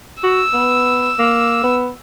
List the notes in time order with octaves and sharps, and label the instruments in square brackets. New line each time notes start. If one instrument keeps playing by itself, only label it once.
[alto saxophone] F#4 [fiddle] E6
[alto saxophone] B3
A#3
B3